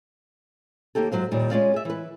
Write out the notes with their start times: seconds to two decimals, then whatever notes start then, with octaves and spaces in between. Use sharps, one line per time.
0.95 D#2 A#3 D#4 G4 A4
1.12 G#2 C#3 F#3 C5 F5
1.31 D#2 A#2 G3 D#4
1.51 G#3 C#4 F4 D5 F5
1.74 G#4 E5
1.85 E3 B4